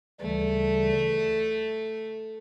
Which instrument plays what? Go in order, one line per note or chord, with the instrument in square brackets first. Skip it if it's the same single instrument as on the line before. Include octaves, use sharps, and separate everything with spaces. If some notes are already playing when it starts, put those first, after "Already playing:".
[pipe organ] D2 C#3 E3 G3 [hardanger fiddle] A3